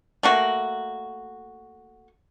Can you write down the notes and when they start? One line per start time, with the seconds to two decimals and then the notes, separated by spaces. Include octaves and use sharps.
0.23 A3 A#3 F#4